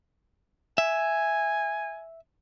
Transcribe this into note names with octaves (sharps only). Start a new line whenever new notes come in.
E5 G#5